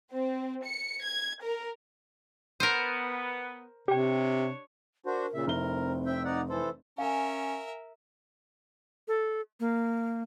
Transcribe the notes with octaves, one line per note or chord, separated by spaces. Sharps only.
C4
C#7
G#6
A#4
B3 A#4 C5 D#7
C3 D4 G4 C#5 G5
D4 F#4 A#4 C5
A#2 C#3 E5
F1 C4 E4 A#4 G7
E5 G5
D#4 D5 F#5
E3 A4 C5
C#4 A#4 E5 F5 G#5
A4
A#3